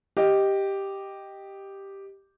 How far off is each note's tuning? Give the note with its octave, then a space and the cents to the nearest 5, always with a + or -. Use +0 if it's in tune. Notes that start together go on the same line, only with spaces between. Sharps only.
G4 +0 D#5 +0